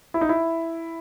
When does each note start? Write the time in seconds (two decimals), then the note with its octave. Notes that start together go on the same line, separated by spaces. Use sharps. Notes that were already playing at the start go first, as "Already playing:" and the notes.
0.14 E4
0.21 D#4
0.29 E4